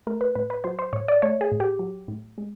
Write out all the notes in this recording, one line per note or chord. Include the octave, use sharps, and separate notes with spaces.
A3 A#4
B4
A2 B4
B4
F#3 C5
C5
A2 C#5
D5
A3 C#5
G#4
A2
G4
F#3
A2
G#3